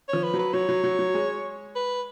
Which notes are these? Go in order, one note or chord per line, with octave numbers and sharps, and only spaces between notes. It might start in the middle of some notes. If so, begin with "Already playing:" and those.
F3 C#5
B4
F#3
B4
F#3 C#5
F#3
F#3
F#3
G#3
B4